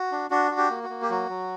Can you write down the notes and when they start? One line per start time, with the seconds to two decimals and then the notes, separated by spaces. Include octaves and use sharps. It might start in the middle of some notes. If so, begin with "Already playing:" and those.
Already playing: F#4
0.12 D4
0.30 D4 F#4
0.51 F#4
0.57 G4
0.70 A#3
0.83 F#4
0.90 A#3
1.02 G4
1.10 F#3 F#4
1.29 F#3